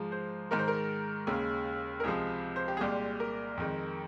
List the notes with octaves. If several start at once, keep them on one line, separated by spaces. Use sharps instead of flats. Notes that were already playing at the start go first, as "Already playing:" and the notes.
Already playing: G#2 F3 G#3
C5
G#2 D#3 G#3 A#4
C5
A#4
D#2 C#3 G#3
A#4
C#2 C3 F3 G#3 G#4
C5
G4
G#4
C2 A#2 G#3 G4
A#4
F2 D#3 G#3